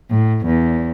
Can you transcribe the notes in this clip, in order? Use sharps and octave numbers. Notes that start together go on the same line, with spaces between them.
A2
E2